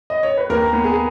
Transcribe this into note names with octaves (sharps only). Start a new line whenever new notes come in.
D#5
C#5
B4
D#2 A#4
B3
G#4